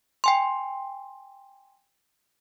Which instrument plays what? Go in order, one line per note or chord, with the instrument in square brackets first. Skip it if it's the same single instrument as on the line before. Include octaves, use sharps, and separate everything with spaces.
[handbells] G5 G#5 C6